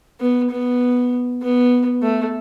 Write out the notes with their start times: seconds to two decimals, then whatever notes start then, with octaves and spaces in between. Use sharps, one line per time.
0.20 B3
0.51 B3
1.42 B3
2.02 A3